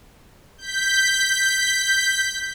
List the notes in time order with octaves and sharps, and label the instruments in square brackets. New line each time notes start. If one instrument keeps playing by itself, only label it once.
[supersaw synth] G6 B6